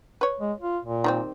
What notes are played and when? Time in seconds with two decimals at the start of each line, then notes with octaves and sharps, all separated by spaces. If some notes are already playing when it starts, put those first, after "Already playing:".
0.21 B4 C#5
0.40 G#3
0.61 F4
0.85 A#2
1.04 D#3 G3 C4